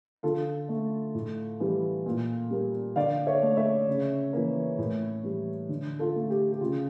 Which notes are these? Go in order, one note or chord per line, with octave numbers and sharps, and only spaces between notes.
D3 F4 A4
A3
A2
E3 G3
A#2
G3 A#3
D3 D5 F5
C#5 E5
A3
C#5 E5
C#3
E3 A#3
A2
E3 G3
D3
F4 A4
A3
G4
G4
C#3 F4